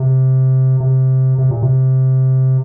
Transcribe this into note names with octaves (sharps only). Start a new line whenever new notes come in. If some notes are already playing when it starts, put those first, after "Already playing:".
Already playing: C3
C3
C3
A#2
C3